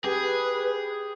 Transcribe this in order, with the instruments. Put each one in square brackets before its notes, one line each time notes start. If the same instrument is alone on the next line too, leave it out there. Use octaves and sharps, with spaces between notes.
[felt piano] G4 [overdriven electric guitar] G#4 [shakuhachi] B4